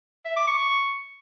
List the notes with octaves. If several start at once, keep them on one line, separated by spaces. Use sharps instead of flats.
E5
D6
C#6